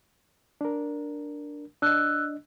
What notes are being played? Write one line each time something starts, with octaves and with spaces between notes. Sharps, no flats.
D4 A#4
D4 D#5 E6 F#6